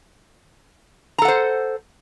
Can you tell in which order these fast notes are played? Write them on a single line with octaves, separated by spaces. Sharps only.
A#5 A4 F#5 C5